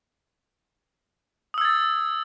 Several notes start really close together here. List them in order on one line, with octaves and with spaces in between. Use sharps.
D#6 E6 G#6 A6